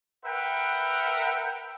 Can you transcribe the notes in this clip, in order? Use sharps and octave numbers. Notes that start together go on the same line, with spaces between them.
A#4 B4 E5 F#5 G5